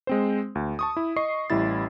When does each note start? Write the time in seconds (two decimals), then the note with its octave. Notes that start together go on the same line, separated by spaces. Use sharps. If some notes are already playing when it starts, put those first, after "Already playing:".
0.07 G#3 C4 C5
0.55 D2
0.79 A5 C#6 D#6
0.97 E4
1.16 D#5 C#6 C7
1.50 A1 G3 E4 A6